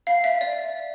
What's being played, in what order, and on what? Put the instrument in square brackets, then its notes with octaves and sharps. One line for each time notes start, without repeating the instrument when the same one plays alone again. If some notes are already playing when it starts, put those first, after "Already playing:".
[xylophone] F5
E5
D5